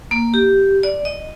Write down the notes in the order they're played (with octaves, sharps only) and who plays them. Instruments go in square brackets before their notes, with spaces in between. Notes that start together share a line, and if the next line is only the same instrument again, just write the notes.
[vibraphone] A#3
G4
D5
D#5